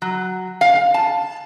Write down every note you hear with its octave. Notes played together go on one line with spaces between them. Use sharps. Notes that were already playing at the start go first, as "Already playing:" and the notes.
F#3
F5
A5